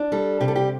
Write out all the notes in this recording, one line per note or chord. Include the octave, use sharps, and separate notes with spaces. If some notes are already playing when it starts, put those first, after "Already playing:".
Already playing: D4
G3 A4
C3 G4
A4
G4